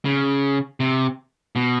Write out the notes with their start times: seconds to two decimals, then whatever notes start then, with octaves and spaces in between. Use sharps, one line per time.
0.05 C#3
0.80 C3
1.56 B2